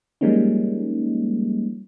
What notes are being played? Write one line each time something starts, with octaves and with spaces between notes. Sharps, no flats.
F3 G3 G#3 A#3 C#4 D#4